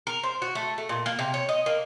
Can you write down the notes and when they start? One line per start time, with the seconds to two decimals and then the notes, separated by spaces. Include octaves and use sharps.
0.07 A#4
0.23 C5
0.42 F#4
0.55 A3
0.78 A3
0.89 A#2
1.06 A#3
1.19 C3
1.34 C#5
1.49 D#5
1.66 A#3